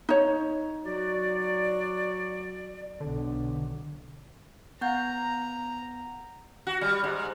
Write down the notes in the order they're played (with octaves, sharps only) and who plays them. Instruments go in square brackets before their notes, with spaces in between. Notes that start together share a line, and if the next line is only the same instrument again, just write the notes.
[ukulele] D#4 C#5
[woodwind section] F#3 F#4 D5
[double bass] B1 [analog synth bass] D3
[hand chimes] B3 F#5 G6 [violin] A#5
[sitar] F#4
G3
G#2